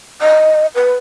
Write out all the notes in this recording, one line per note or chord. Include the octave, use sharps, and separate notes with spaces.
D#5
B4